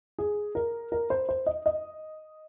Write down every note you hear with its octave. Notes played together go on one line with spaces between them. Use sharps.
G#4
A#4
A#4
C5
C5
D#5
D#5